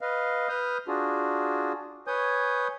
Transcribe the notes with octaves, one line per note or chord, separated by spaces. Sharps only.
B4 D#5 F5
B4 D#6 F6 G6
D4 F4 F#4 G#4
B4 C#5 G#5 D#6 G6